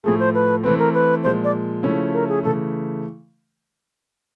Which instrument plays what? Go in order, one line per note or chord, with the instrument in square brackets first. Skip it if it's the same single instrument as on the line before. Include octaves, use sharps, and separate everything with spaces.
[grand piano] A2 F3 A3 [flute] G#4
[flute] C5
B4
[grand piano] E3 A3 C4 [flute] B4
[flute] A#4
B4
[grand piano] A#2 F3 G#3 [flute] C5
[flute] D5
[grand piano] C#3 F3 A3 C#4 E4
[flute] A#4
G#4
[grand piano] C#3 E3 A3 [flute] A4